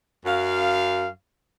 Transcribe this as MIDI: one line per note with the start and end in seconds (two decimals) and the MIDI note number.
0.25 1.08 42
0.25 1.08 77